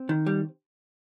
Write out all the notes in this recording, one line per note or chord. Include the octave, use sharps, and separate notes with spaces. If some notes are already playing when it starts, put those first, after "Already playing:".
Already playing: C4
D#3
G3